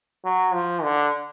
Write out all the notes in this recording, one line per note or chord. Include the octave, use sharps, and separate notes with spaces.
F#3
F3
D3